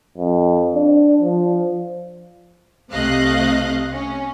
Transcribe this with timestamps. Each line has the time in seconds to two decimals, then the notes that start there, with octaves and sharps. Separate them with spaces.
0.18 F2
0.75 D4
1.22 F3
2.93 C2 C3 A3 D#5 F5 F#6
3.94 C#4